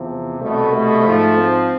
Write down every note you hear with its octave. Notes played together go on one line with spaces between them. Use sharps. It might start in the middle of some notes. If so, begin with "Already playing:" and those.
Already playing: E2 C3 F3
C2 B2 A3
A3
G#2 F3
C4